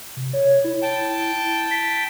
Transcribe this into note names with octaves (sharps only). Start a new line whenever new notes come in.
C3
C#5
E4
G5 A5
B6